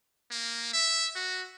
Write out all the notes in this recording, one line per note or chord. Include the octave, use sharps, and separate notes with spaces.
A#3
E5
F#4